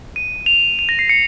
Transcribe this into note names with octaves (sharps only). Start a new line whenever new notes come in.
D#7
F7
F7
A#6
C7
C#7